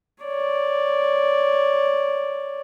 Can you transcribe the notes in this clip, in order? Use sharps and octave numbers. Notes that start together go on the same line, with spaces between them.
C#5 D5